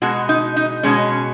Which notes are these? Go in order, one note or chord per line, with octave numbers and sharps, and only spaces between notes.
B2 G#3 F#4
D#4
D#4
B2 G#3 C#4